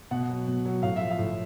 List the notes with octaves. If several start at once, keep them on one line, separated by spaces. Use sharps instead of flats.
B2 F#5
F#3
B2
F#3
A2 F5
F3 E5
F5
A2